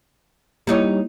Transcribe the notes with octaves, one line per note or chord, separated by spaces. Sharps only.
G3 A#3 D#4 E4 C#5